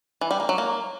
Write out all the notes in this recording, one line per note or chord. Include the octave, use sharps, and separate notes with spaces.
E3
G3
A#3
F#3
A#3